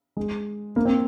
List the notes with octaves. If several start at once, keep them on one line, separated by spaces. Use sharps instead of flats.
G#3
A#3
C4